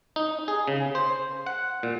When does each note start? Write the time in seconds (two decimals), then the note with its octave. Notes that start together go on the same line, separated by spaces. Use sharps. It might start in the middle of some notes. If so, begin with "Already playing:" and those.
0.16 D#4
0.48 G#4
0.68 C#3
0.95 C5
1.46 F#5
1.83 A#2